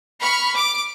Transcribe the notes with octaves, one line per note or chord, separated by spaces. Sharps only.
B5 C#6 F6
D6